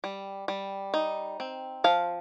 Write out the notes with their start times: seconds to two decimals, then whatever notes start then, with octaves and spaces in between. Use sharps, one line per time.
0.04 G3
0.48 G3
0.94 D#4
1.40 C4
1.84 F3 F5